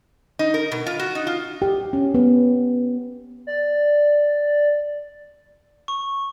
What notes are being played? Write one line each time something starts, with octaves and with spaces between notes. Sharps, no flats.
D#4
A#4
B2
F4
F#4
D#4
F4
G4
C#4
B3
D5
C#6